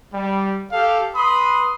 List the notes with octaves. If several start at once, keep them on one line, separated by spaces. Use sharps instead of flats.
G3
G4 A4 F5
B4 B5 C6 D#6